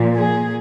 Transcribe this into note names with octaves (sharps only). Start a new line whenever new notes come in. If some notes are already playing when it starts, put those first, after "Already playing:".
Already playing: A#2 F3
G#4